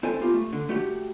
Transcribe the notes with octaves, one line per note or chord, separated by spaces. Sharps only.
C4 E4 A4 C5 G#5
B3 F4 G4
A3
D3
A3 F#4 G4